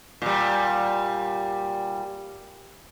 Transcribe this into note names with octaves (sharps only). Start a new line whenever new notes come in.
A#2 G3